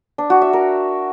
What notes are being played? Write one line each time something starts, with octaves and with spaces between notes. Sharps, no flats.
D4
F#4
E5
A#4